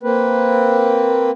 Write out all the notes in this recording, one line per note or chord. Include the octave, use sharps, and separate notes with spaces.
A#3 C4 B4